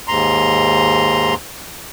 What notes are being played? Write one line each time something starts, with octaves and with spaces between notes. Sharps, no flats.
D#2 G#2 A#5 C6